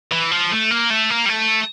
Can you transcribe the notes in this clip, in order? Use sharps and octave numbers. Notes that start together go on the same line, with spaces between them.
E3
F3
A3
A#3
A3
A#3
G3
A3